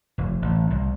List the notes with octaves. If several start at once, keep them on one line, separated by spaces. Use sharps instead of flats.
F1
A1
C2